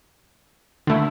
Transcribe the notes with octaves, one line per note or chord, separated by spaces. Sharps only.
D3 A3 E4